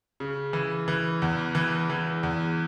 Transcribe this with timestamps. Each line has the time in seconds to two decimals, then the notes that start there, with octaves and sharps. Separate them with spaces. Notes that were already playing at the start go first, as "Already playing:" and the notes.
0.20 C#3
0.53 E3
0.88 E3
1.22 E2
1.55 E3
1.90 E3
2.23 E2